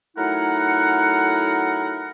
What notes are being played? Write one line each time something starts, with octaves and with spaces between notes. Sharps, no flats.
F#3 A3 D#4 E4 A#4 F#5